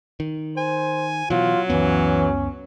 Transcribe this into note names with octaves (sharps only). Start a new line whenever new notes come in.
D#3
C5 G#5
B2 E3 F#3 F4
C#2 F#2 E3 B3 C#4